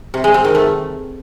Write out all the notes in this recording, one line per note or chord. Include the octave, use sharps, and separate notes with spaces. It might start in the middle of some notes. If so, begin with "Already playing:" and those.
C3
G#3
C4
D#3
A3